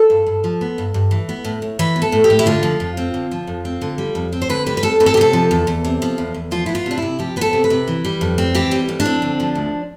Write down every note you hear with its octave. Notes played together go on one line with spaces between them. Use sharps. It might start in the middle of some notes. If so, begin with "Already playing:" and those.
Already playing: A4
G2
G2
F3
B3
G2
G2
E3
B3
A2
A2
E3 B4
B3
A4
A2
G4
A2
E4
D3 F4
F3
F2
C4
D3
F3
F2
C4
D3
G3
F2
C4
C5
D3 B4
G3 B4
B4
F2 A4
C4 B4
A4
G4
C3 A4
F3
E2
E2
C3
F3
E2
E2
F3 F4
B3 E4
F4
C3 D4
C3 E4
F3 G4
B3 B4
A4
C3
B4
C3
E3
G3
F2
C4
E3 G4
G3
F2
D4
C4
D3
F3
D2